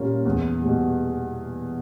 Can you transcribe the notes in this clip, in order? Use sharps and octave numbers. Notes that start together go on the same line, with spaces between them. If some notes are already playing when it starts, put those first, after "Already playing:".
Already playing: A#2 G3 A#3 C#4
E2
B2 G3